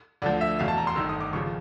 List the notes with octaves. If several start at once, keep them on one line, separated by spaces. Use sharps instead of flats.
D2 D3 F3 D5
E5
F1 E2 B2 F5
A5
A#5
C6
G1 G2 D#3 E6
D#6
D6
D#2 C#3 F3 C#6